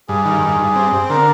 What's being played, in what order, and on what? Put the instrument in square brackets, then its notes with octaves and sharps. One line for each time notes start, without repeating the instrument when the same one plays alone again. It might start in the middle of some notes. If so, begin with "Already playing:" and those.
[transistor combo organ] G2 [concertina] G#4
[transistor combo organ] D#3
G2
G2
C4
C4
[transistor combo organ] D3 [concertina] A#4